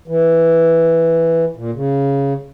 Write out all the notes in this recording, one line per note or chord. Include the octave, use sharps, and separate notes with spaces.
E3
A#2
C#3